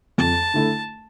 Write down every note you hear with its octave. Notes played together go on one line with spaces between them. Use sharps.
F2 A5
D3 A3 E4